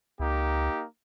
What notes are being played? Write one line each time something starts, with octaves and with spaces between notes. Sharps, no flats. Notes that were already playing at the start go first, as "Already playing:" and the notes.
C#2 A#3 D#4 G4